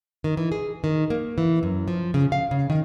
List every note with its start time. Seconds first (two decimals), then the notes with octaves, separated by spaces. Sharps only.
0.24 D#3
0.37 E3
0.52 G#4
0.84 D#3
1.10 A#3
1.38 E3
1.63 F#2
1.88 F3
2.14 C#3
2.32 F5
2.51 C#3
2.70 D#3